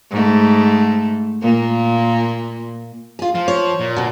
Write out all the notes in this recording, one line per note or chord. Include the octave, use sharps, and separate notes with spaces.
G#2 A3
A#2 A#3
F4 G#4
F3 F4
C#5
A#2
D2 B2